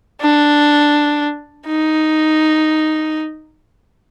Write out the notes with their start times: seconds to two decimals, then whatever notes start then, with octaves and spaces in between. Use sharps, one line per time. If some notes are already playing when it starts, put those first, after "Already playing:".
0.21 D4
1.67 D#4